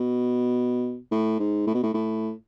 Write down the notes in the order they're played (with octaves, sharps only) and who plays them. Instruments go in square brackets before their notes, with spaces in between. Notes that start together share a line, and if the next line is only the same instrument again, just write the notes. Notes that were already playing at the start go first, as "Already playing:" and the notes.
Already playing: [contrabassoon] B2
A2
G#2
A2
B2
A2
A2